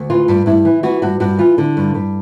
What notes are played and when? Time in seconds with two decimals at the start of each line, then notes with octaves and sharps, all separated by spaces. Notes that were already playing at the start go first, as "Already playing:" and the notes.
Already playing: D2
0.10 E3 F4
0.28 G2
0.46 G2 E4
0.65 E3
0.83 E3 F#4
1.02 G2 F#4
1.20 G2 F#4
1.39 E3 F4
1.58 D3
1.77 G2
1.94 G2